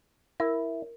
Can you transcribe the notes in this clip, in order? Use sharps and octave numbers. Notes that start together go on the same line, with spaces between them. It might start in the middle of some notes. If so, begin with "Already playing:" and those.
E4 A#4